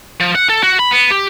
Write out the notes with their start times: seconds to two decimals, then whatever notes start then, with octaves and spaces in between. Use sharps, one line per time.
0.20 F3
0.35 F#5
0.49 A4
0.63 F#4
0.79 B5
0.91 B3
1.11 G4